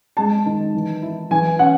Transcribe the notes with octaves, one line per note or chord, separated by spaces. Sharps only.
G#3 A5
D#3
E3
E4
E3 G#5
C#4 F#5